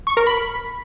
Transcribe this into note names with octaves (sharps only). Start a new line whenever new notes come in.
C#6
A#4
B5